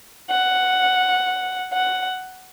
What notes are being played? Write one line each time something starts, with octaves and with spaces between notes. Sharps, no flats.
F#5
F#5